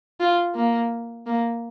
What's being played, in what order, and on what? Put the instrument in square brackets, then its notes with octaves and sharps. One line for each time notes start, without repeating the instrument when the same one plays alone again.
[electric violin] F4
A#3
A#3